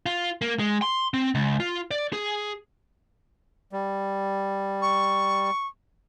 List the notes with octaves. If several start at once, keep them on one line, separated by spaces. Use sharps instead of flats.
F4
A#3
G#3
C6
C4
C#2
F4
D5
G#4
G3
C#6